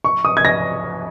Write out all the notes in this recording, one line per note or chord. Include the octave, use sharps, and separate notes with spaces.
C#6
D#6
G#6
A#6